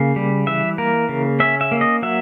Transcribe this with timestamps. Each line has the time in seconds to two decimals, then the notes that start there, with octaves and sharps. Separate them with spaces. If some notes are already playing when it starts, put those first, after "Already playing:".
Already playing: C#3 A#3
0.16 G3
0.47 E3 E5
0.78 A#3 A#4
1.09 C#3
1.40 C#4 E5
1.61 E5
1.72 A#3
1.81 D#5
2.02 F#3 E5